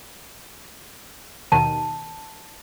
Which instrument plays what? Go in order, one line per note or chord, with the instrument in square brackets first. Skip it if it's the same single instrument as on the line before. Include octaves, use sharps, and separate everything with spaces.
[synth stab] D#2 B2 D#3 [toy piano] A5